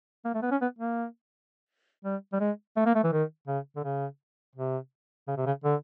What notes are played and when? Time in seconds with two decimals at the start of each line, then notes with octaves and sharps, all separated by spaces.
0.25 A#3
0.34 A3
0.42 B3
0.51 C#4
0.61 B3
0.78 A#3
2.05 G3
2.32 G3
2.40 G#3
2.76 A3
2.86 A#3
2.95 A3
3.04 E3
3.12 D#3
3.47 C#3
3.76 D3
3.84 C#3
4.56 C3
5.27 C#3
5.37 C3
5.46 C#3
5.64 D3